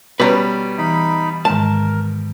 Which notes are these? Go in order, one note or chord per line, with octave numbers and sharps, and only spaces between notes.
B2 G3 C#4 B4 C#5 A#5
E3 D#4 B5
G#2 D#3 G#3 A#4 A5